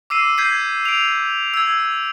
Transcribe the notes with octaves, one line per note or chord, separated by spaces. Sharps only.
D6 E6 C7 D#7
G6 G#6 B6 C7 D#7
D7 F7
E6 G#6